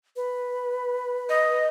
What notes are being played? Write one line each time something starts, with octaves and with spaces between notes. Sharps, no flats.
B4
D#5